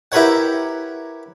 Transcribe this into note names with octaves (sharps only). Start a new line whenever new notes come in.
E4 G4 A#4 B4 C#5 F#5